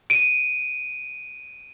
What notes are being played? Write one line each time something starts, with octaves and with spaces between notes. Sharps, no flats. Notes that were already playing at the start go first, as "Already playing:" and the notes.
D7 D#7